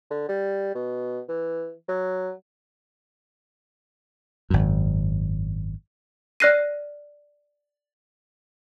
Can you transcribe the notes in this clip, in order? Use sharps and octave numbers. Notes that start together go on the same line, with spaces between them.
D3
G3
B2
E3
F#3
G#1 F#2
D5 F6 F#6 A#6 C7 D#7